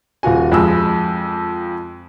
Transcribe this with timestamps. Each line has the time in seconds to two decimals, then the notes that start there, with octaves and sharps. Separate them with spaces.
0.23 D#1 F4 F#4 G#5
0.52 F2 G#3 B5 E6